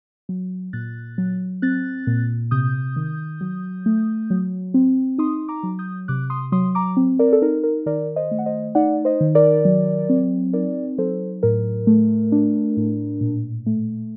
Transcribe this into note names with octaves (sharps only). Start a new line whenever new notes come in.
F#3
A#2 F#6 A6
F#3
C4 F#6 A6
A#2
C3 D#6 G6
D#3
F#3
A3
F#3
C4
D#4 C6 D#6
A#5 D6
F#3
D#6 G6
C3 D6 F#6
C6 D#6
F#3 C6 D#6
A#5 D6
C4
A#4 D5
A4
D#4 A#4
A#4
D#3 A#4 D5
C5 D#5
A3
F#5
C5 D#5
D#4 D5 F#5
C5 D#5
D#3
A#4 D5
F#3
C4
D#4 A#4 D5
F#3 A4 C5
A2 A#4
A3
D4
A2
A#2
A3